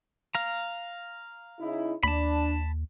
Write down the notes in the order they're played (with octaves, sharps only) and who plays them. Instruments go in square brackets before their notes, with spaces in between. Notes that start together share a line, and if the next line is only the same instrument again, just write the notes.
[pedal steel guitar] F5 A#5
[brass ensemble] C#3 D#4 E4
[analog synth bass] D#2 [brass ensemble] D4 [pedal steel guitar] A5 B5